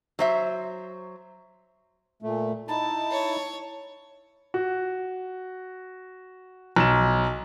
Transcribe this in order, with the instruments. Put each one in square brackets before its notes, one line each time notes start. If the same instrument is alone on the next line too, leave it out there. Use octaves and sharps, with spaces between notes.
[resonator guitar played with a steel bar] F#3 C5 E5
[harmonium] A#2 A3
[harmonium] D#4 E4 [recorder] A5
[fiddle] C#5
[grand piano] F#4
B1 E7